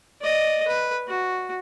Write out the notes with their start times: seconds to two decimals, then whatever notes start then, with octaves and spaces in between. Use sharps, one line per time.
0.21 D5 D#5
0.67 B4
1.08 F#4